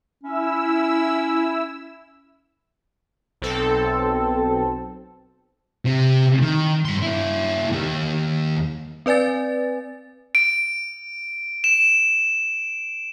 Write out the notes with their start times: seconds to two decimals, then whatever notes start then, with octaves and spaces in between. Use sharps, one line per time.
0.23 C#4 E4 E6
3.42 B1 C4 A4
5.85 C3
6.42 D#3
6.85 G2 C6
7.02 A#3 E4
7.73 D#2 D#3
9.06 C4 B4 D5 G#5 A6
10.35 D7
11.64 E7